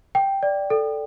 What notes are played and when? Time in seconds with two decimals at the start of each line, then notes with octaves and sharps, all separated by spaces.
0.15 G5
0.43 D5
0.70 A4